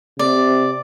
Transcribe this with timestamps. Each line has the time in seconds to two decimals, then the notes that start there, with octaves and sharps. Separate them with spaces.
0.19 C3 D5